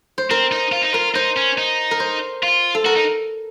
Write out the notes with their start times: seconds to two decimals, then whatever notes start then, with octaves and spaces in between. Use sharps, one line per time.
0.18 C5
0.30 C4 A#4
0.52 D#4
0.72 F4
0.83 D#4
0.93 F4 A#4
1.15 D#4 C5
1.37 C#4
1.58 D#4
1.91 A#4
2.00 C5
2.43 F4
2.75 A4
2.85 F#4 A#4
2.96 D#4